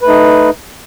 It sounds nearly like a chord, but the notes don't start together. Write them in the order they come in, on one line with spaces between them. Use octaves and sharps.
B4 A3 D#4